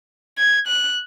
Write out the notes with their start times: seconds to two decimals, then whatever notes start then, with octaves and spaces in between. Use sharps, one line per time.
0.38 G#6
0.68 F#6